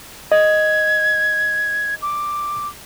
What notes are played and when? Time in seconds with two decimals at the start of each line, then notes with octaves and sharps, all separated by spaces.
0.32 D#5 G#6
2.02 D6